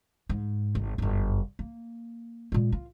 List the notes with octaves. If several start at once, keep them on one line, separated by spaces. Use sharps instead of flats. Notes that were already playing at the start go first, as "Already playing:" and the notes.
G#2
G#1
G1 F#2
A#3
A#2 G#3
F4